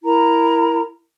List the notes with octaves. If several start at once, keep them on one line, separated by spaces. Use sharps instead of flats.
E4 A#4 A#5